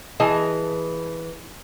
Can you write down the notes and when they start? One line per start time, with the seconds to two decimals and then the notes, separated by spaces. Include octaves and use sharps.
0.20 E3 G#4 D#5 A5